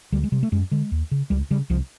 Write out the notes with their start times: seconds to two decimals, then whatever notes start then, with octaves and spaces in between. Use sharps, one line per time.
0.12 D2 G3
0.23 G#3
0.32 C3 G3
0.43 A3
0.52 F#2 G#3
0.71 D3 G#3
0.92 D#2
1.11 C#3
1.30 C#2 G3
1.51 C#3 G3
1.70 C2 F3